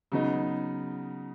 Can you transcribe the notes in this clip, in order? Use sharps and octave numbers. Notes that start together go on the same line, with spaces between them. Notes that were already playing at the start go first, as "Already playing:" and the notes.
C#3 F#3 B3 D#4